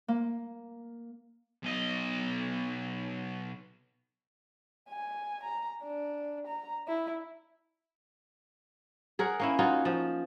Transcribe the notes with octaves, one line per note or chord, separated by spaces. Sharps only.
A#3
B1 D#5
G#5
A#5
D4
A#5
E4
G#4 A#4 C#5 F#5
A#3 C#4 E4
D#4 F4 F#4 C#5
F3